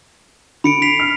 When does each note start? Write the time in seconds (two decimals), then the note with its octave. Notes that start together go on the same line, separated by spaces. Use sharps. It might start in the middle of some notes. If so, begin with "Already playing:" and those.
0.64 D3 B5 C#7 D7
0.82 B6 C7 F7
0.99 F6